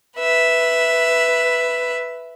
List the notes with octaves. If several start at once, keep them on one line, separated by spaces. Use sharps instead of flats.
B4 E5